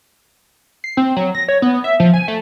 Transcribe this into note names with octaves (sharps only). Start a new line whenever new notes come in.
C7
C4
F#3
A#6
C#5
B3
E5
F3
G#5
A3